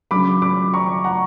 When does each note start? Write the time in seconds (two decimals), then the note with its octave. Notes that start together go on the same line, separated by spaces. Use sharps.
0.11 C#3 F#3 B5 D6
0.42 B5 D6
0.73 A#5 C#6
1.04 F#5 A#5